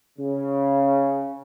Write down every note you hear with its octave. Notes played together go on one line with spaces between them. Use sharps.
C#3